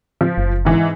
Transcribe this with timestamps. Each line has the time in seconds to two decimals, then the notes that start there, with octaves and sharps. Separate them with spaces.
0.21 F3
0.38 F#1
0.65 G#2 E3